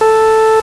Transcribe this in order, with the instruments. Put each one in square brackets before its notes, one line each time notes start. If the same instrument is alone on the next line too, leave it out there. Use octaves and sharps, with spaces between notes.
[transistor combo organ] A4